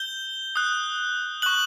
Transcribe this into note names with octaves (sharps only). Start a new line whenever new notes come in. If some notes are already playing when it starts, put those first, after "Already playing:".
Already playing: G6 G7
D#6 F#6
C#6 F#6 F#7